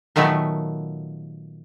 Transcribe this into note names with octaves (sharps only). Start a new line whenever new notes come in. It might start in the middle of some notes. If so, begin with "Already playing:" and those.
A#2 D#3 F#3 A3 B3